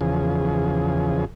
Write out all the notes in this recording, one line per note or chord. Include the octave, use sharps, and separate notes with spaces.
E2 C#3 F3 G#4